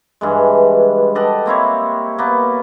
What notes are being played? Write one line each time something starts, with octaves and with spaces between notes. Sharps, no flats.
G2 E3 G#3
G4 A4 D#5 F#5
A#3 C4 E4 C#5
A#3 B3